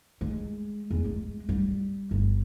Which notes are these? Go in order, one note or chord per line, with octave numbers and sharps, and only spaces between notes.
G#3
E2
G#3
G3
G1